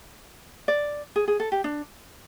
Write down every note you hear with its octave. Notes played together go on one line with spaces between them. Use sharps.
D5
G#4
G#4
A4
G4
D4